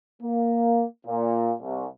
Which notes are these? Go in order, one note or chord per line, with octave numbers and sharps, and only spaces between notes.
A#3
A#2
C2